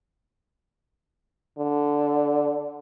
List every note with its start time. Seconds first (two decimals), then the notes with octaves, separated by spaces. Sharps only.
1.59 D3